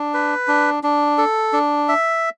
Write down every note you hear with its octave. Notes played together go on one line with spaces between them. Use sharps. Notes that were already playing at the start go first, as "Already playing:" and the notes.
Already playing: D4
B4
D4
D4
A4
D4
E5